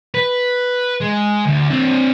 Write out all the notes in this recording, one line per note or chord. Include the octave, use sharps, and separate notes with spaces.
B4
G#3
D2
C4 D4